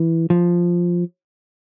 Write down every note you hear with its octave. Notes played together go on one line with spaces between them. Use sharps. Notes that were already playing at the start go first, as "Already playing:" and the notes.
Already playing: E3
F3